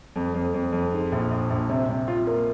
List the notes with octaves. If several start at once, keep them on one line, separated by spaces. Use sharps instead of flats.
F2
F2
F2
F2
G#2
A#1
A#1
A#1
C3
C3
F4
A#3